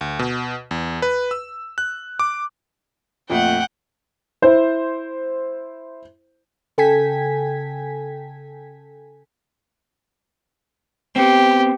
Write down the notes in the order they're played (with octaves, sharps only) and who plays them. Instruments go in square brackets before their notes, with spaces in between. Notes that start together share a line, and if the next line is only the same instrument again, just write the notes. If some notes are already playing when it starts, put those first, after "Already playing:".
[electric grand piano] D2
B2
E2
B4
E6
F#6
D6
[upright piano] F2 A#2 A3 [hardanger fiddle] F#5 G5
[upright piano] E4 C5
[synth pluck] C#3 A4 G5 G#5 G#6 B6
[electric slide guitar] B3 C4 [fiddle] G4